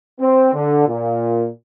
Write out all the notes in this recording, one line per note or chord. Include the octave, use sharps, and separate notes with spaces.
C4
D3
A#2